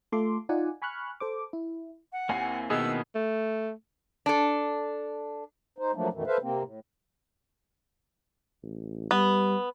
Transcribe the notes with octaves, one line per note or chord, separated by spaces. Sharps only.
A3 F4 A4 C6 D6
D#4 F4 D5 F#5 G#5
G#5 B5 C#6 F6 F#6
A4 C5 D6
E4
F#5
D#2 A#3 C4 E4 G#5 C7
B2 D#3 B3 G#4 D#5 E6
A3
D4 A4
D#4 C5
F3 F#3 A3 A#3 D4
F#2 B2 D#3 E3 A3
A4 B4 C5 E5 F5
C3 A#3 C4
A2
A1
G3 B3